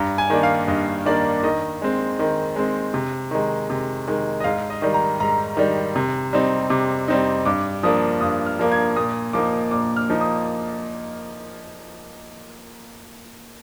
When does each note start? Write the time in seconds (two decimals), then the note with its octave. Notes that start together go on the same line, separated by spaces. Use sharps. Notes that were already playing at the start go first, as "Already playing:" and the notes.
Already playing: G2 A#5
0.18 G#5
0.30 D#3 A#3 D4
0.43 F5
0.68 G2 D#5
1.05 D#3 A#3 D4 D5
1.43 D#3 D#5
1.82 G#3 C4
2.19 D#3
2.56 G#3 C4
2.94 C3
3.31 D#3 G#3
3.70 C3
4.07 D#3 G#3
4.40 D#5
4.44 G#2 F5
4.70 D#5
4.82 D#3 G3
4.94 A#5
5.20 G#2 A#5
5.57 D#3 G3
5.96 C3
6.33 G3 C4 D#4
6.70 C3 D6
7.08 G3 C4 D#4
7.45 G2 D6
7.83 F3 A#3 D4 D#6
8.21 G2 D#6
8.46 F6
8.59 F3 A#3 D4
8.72 G#6
8.96 A#2 D#6
9.33 F3 A#3 D#4 D6
9.71 A#2 D6
9.97 F6
10.09 F3 A#3 D#4
10.21 D#6